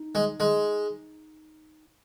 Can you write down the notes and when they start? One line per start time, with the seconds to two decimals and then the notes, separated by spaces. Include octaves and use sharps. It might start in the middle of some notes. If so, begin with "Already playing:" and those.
Already playing: D#4
0.15 G#3
0.40 G#3